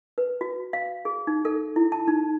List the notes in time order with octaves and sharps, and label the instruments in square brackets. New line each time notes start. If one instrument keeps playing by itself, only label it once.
[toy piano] B4
F#4
F5
G#4
D#4
A4
E4
A5
D#4